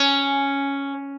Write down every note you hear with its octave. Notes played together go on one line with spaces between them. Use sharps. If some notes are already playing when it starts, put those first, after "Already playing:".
Already playing: C#4